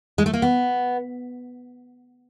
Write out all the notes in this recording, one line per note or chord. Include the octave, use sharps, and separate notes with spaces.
G#3
A3
A#3
B3